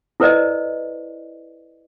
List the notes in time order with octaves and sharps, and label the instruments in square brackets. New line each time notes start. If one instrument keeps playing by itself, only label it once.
[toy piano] E4 A4 B4 C5 D5 D#5